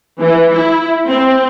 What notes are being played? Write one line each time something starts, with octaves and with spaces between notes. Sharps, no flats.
E3
E4
C4